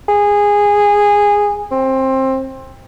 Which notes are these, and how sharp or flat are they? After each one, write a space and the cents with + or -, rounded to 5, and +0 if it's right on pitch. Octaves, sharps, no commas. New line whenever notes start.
G#4 -15
C4 +20